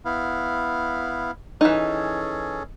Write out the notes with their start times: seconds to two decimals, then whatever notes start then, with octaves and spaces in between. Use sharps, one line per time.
0.05 B3 E4 F5
1.61 E3 C#4 D#4 G#4 A4